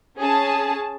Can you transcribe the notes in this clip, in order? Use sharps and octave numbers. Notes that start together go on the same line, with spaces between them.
C#4 G#4 A5